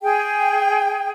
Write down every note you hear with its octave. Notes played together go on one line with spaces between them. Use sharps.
G#4 G5